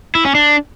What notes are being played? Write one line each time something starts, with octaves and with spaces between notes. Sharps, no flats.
E4
C#4
D4